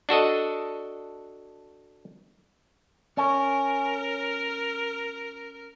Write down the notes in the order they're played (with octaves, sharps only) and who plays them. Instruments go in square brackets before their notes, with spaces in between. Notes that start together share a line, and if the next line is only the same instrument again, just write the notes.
[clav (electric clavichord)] D4 F#4 A4 D#5
[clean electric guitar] C#4 [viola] A#4